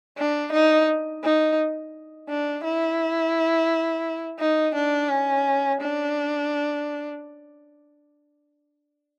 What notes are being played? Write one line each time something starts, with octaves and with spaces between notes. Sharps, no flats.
D4
D#4
D#4
D4
E4
D#4
D4
C#4
D4